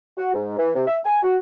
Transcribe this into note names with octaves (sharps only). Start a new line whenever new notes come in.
F#4
G#2
E3
C3
E5
G#5
F#4